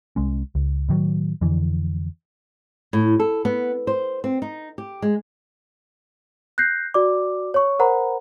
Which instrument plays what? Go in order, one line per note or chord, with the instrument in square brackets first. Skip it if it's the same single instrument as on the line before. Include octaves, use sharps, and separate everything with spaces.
[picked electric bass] C2 G#3 C#4
C#2
A2 D#3 E3 F#3
F2 D3 E3
[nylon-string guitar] A2
A4
B3
C5
C4
D#4
G4
G#3
[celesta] F#6 G6 A#6 C7
F#4 D5 D6
C#5 C#6
A#4 C5 F#5 A#5 B5